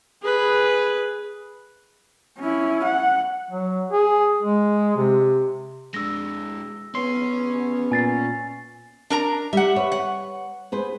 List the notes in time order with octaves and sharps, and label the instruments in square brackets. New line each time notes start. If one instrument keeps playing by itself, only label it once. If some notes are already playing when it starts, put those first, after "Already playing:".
[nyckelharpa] G#4 B4
[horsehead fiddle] C#4 E4
F#5
[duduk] F#3
G#4
G#3
C3
[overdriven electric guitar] G#3 D4 [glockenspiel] E6 A#6
[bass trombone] B3 [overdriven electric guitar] C#4 C#5 [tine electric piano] C6
[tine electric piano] A#2 [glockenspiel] G#5 A6 C7
[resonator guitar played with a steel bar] D4 A#4 A#5
[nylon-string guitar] G3 [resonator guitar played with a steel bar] E5 F#5
[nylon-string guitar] B4 C#5
[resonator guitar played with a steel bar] F#5
[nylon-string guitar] G#4 B4 C5